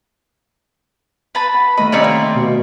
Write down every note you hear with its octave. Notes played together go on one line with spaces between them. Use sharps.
B4 A5 B5
F#5
D#3 A3 D#5 B5
G3 C4 C#4 D#4 C#5 D5 F5
A#3
B2